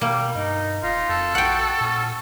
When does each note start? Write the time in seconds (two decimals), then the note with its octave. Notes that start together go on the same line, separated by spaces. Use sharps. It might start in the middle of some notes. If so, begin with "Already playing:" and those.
0.01 B2 G3 A#3
0.35 G2 D#4
0.83 D#1 D#4 F4
1.09 F2 A4
1.35 A#1 F#4 F#5 G5
1.80 A#2 C#4